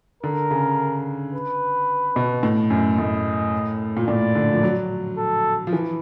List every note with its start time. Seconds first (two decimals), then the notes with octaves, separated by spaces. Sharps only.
0.23 D3 A#4
0.51 C#3
1.34 B4
2.16 B2
2.43 A2
2.70 F#2
2.98 A2 D#5
3.97 A#2
4.08 A2 D5
4.35 D3
4.52 F3
4.63 F#3
5.17 A4
5.67 F3
5.73 E3